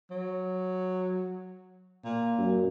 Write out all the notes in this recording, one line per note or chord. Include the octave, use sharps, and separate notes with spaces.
F#3
A#2
F#2